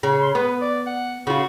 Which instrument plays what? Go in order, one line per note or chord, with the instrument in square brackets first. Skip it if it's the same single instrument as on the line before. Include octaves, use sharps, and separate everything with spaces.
[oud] C#3
[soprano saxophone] C6
[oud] B3 [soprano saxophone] B4
[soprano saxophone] D5
F#5
[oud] C#3 F4 [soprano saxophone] F#4